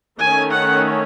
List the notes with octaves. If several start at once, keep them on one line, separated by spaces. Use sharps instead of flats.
D#3 A3 C#4 G#5
F#5